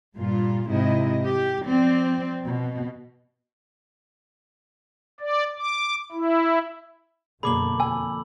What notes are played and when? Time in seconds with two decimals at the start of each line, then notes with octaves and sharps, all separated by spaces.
0.16 G2 A#2 F4
0.70 G#2 C3 E4 D#5
1.25 G4
1.66 F3 C4 D5
2.45 B2
5.20 D5
5.58 D6
6.12 E4
7.43 F#2 B2 D3 A#3 G#4 B5 D6 F#7
7.80 F2 G#5 E6